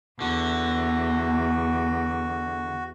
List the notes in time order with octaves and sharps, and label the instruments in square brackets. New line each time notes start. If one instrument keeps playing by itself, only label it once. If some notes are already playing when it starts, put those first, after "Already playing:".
[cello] E2 [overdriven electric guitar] D3 [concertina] F#4